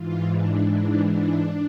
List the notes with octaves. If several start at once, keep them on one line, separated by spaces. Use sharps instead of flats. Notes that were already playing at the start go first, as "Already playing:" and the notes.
Already playing: G#2 E3 F4
D4
D4
D4